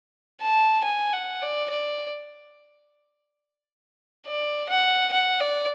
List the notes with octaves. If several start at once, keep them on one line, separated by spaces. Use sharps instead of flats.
A5
G#5
F#5
D5
D5
D5
F#5
F#5
D5